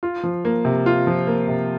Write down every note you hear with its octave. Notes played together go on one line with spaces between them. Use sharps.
F4
F3
A#3
C3
F4
F3
A#3
C3